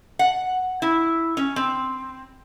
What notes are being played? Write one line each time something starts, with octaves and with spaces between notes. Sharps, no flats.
F#5
E4
C#4
C4